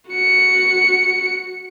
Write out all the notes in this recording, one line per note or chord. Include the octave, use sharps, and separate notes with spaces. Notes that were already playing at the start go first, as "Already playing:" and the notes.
F#4 C#7